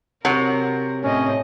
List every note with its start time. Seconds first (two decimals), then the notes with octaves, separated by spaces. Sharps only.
0.25 C3 F#3 A#4
1.03 A2 C4 C#4 D#5